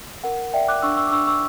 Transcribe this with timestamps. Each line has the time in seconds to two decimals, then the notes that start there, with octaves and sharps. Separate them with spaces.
0.24 A#4 F#5
0.53 D5 E5 G5
0.68 D6 F#6
0.82 D4 C#6 E6
0.97 C#6 E6
1.07 D6
1.12 D4 C#6 E6
1.27 C#6 E6